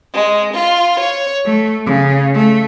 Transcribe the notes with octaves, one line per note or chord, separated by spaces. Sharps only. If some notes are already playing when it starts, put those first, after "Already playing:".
G#3
F4
C#5
A3
C#3
A3